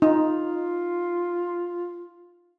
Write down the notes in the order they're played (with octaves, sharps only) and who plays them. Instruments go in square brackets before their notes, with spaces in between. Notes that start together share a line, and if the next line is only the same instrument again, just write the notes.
[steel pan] D#4 [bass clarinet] F4